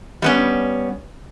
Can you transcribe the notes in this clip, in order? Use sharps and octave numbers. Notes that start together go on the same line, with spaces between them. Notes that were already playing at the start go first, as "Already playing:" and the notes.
G3 B3 C#4